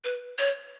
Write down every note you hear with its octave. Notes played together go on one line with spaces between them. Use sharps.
B4
C#5